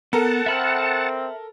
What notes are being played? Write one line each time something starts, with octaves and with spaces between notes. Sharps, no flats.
B3 A4 A#4 F#5 A5
C4 E5 B5 F6